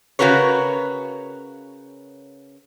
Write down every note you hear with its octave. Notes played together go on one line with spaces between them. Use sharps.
C#3 F#4 A#4 B4 C#5